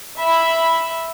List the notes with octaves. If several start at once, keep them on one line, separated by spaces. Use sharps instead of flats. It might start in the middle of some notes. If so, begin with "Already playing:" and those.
E5 B5